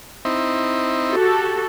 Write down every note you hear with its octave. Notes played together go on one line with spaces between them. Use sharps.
C4 D#4 E4
F#4 G4 A4